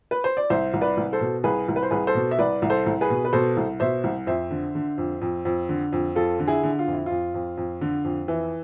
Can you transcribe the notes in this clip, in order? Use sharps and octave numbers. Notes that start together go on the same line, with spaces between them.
B4
C5
D5
C2 C5 E5
C2
B4 D5
C2
A4 C5
B2
C2 G#4 B4
C2
B4
C5
C2 G#4 B4
A4 C5
B2
E5
C2 B4 D5
C2
A4 C5
C2
G#4 B4
B2
B4
B2 A4 C5
C2
B2 C5 E5
C2
F2 C5 E5
D3
D3
F2
F2
F2
D3
F2
F2 F4 A4
D3
E4 G#4
D3
F4
F2
E4
F2 F4
F2
F2
D3
F2
E3